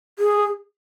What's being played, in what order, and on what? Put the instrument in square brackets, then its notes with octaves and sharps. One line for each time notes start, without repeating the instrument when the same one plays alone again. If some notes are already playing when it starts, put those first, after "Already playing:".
[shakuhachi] G#4